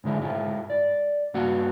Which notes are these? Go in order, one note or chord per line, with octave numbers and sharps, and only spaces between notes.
G#2 D3 G#3 E4
G#2 E4 F4
D5
G2 A#3 B3 F#4 F#5